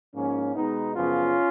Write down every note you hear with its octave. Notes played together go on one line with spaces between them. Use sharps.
G#2 F3 A#3 C#4
B2 G#3 B3 D#4
F#2 C#3 F3 B3 C#4 F4